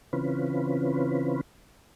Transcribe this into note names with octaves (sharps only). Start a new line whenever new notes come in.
C#3 E3 C4 C#4 F4 B4